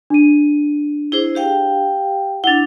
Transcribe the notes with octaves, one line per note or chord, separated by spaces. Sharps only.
D4 D#7
E4 G#4 C5
G4 F5 G5
D4 E4 F#5 A6